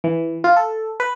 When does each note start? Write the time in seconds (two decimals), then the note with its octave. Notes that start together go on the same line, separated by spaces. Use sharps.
0.04 E3
0.44 F4
0.56 A4
1.00 B4